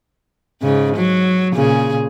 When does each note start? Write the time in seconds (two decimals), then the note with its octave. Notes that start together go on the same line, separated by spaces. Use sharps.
0.62 G#2 C#3
0.96 F#3
1.54 A#2 C#3 G#4